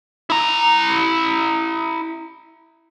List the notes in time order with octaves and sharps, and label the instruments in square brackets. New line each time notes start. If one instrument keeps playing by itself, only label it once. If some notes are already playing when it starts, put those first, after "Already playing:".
[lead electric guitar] E4 A#5